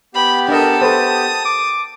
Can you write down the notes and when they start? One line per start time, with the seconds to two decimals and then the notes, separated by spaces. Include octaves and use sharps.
0.15 B3 G4 B5
0.49 D4 A4 A#4 D#5
0.81 A4 B4 C5 A5 D#6
1.45 D6